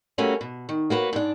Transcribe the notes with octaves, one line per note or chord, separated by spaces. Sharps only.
G3 A3 A#3 C#4 F#4
B2
D#3
A#3 F#4 B4 C#5
G#2 D4